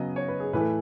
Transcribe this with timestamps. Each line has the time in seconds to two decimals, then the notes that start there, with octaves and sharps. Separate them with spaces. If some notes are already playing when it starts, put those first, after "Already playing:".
Already playing: C#3 F#3 B3 D#5
0.16 C#5
0.28 B4
0.40 G#4
0.53 A2 E3 A3 B4